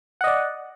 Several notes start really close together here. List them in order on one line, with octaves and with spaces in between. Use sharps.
F#5 D#5 D5